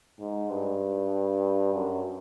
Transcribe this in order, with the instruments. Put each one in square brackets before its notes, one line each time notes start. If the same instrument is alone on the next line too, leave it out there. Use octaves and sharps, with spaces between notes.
[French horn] G#2
G2
F#2